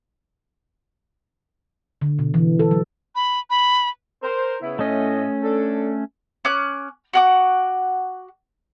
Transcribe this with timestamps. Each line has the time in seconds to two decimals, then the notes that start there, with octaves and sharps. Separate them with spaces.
2.02 D3
2.19 B2
2.34 E3
2.59 A4
2.71 F#3
3.16 B5
3.50 B5
4.23 A#4 C5
4.61 C#3 B3 E4
4.79 A2 A3 C#4 D#5
5.43 D4 A4
6.45 C#4 D6 F#6
7.13 F#4 F#5 D6